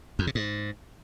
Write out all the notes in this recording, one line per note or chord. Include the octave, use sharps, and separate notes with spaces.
F2
C3
G#2